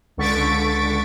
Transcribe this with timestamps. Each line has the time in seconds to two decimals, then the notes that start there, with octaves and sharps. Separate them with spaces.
0.17 C#2 D3 C#6 A6 B6 D7